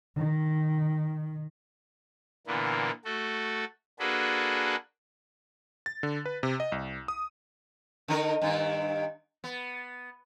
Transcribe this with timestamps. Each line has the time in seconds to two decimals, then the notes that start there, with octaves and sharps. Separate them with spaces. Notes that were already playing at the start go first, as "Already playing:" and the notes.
0.17 D#3
2.47 A#2 D3 E3 A#3 B3
3.05 A3 F#4 A4
3.99 A#3 D4 F#4 G#4 A4 B4
5.86 A6
6.03 D3
6.26 B4
6.43 C3
6.60 D#5
6.72 C2
7.08 D#6
8.08 D3 D#4 A#4
8.42 G2 D#3
9.44 B3